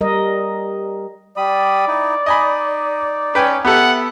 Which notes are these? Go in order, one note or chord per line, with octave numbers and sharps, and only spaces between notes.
G3 A#4 D#5
G3 D5 B5 D#6
D#4 E4
D#4 D#5 G#5 B5
C#4 B4 G5 G#5
B3 G4 A4 E5 F#5